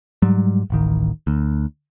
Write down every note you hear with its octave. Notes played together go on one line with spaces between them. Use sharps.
G#2 F#3 G3
D1 A1 D#3
D2